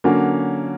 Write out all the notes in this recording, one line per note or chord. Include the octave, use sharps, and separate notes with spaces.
D3 F#3 A#3 C#4 F#4